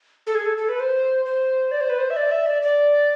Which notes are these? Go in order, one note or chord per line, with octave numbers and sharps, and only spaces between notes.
A4
G#4
A4
A4
B4
C5
C5
D5
C5
B4
C5
E5
D5
E5
D5
D5